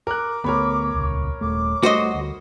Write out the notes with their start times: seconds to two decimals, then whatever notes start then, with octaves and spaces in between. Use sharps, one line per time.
0.07 A#4 D6 F#6
0.44 D2 A3 B3 A#4 C#5 B5
0.94 D#1 C#2
1.41 D#1 A3 D6
1.83 G3 A3 F#4 C5 D#5
2.15 D2